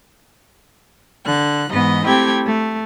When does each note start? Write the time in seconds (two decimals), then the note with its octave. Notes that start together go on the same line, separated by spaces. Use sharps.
1.25 D3 F#6
1.69 G#2 E3 B3 D#5
2.06 A3 C4 E4 G4 G5 G#6
2.45 A3